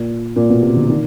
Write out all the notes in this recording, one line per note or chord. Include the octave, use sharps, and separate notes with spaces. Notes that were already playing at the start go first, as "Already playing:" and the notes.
Already playing: A#2
A#2
B2
C3
D3
D#3